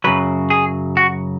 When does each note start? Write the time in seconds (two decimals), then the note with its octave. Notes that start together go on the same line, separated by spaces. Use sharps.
0.04 F#2 C#3 F#3 B4
0.50 G#4
0.97 F#4